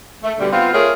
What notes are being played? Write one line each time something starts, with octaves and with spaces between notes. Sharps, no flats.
A3
B2 D3 G3
B3 C4 F4
A3 F4 G#4 A#4 C#5